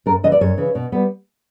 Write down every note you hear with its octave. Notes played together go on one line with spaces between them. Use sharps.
F#2 A#4
C#3 E3 D#5
D5
F#2 C#5
C#3 E3
B2
G3 B3